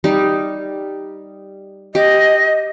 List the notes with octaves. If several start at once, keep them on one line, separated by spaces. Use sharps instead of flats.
G3 D#4
G4 D#5